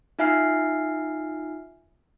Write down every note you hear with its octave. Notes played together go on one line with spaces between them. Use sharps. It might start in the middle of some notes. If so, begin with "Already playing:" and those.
D#4 F4 E5 G#5 F6 C7